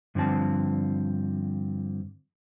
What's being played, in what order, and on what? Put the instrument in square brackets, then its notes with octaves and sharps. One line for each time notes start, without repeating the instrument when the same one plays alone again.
[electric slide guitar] G2 D3 F3 C4 A5